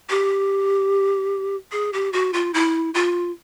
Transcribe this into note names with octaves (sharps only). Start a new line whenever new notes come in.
G4
G#4
G4
F#4
F4
E4
F4